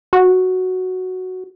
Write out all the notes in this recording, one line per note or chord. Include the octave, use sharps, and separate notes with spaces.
F#4